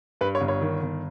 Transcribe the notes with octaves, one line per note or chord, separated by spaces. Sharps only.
G2 B4
C#5
G1
C#5
D#3
G1